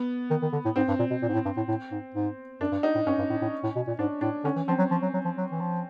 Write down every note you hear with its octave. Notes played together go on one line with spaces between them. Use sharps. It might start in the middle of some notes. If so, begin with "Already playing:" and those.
Already playing: B3
D#3
D#3
D3
A2
G#2 C4
G2
A#2
B2
A#2
G#2
A2
G2
A2
A2
G#2
G#2
F#2 D4
G2
D#4
A2
G2 C#4
G2
A2
A2
A2
B2
A#2
G#2 D4
A2 D4
D3 C#4
E3
F3 C4
F#3
F3
F#3
F#3
F3
F#3
E3
F3